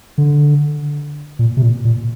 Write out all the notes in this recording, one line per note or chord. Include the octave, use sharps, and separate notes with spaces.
D3
A#2
C3
A#2
A#2